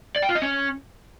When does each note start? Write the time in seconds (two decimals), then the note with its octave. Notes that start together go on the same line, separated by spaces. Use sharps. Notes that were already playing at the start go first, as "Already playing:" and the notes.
0.16 D5
0.22 G5
0.29 F4
0.35 D#5
0.42 C#4